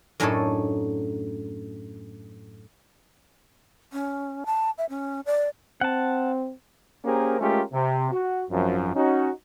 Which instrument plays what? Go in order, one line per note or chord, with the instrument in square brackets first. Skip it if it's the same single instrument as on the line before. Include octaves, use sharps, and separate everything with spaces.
[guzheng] F#2 A2 D4 D#4 A4 C#5
[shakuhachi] C#4
A5
E5
C#4
D5
[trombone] C4 [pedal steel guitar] F#5 A5
[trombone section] A#3 C#4 G4 G#4 A#4 C5
G#3 A3 C#4 F4 G4 A#4
C3
F#4
G#1 F#2 F3
C#4 D#4 F#4